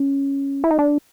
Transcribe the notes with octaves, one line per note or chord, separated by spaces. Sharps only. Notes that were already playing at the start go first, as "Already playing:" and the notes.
Already playing: C#4
E4
D#4
D4